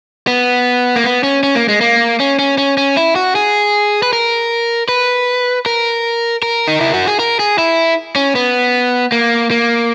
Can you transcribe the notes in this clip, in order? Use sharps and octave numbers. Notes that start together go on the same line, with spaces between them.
B3
A#3
B3
C#4
C#4
A#3
G#3
A#3
C#4
C#4
C#4
C#4
E4
F#4
G#4
B4
A#4
B4
A#4
A#4
D#4
E4
F#4
G#4
A#4
G#4
E4
C#4
B3
A#3
A#3